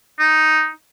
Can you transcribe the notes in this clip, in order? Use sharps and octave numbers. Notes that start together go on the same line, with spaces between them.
D#4